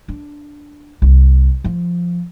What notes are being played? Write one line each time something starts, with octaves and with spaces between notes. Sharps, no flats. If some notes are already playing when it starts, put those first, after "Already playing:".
D4
C2
F3